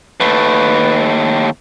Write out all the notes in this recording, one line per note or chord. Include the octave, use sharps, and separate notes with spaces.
D#2 A3 B4